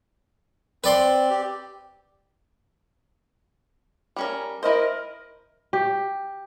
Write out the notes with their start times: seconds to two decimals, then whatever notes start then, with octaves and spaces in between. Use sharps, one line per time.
0.84 C4 B4 D5 C6
1.30 G4
4.16 G3 C#4 A#4
4.63 E4 A#4 C5 D#5
5.73 G4